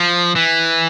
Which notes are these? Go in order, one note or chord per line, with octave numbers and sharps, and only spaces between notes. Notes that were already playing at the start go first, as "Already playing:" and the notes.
Already playing: F3
E3